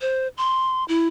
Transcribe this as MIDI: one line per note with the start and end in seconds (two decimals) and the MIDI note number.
0.01 0.28 72
0.37 0.84 84
0.89 1.08 64